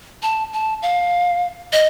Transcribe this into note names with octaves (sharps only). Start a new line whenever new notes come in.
A5
A5
F5
D#5